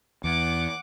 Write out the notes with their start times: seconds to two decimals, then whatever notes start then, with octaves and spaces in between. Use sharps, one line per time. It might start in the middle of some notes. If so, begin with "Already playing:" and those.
0.24 E2 F#5 D6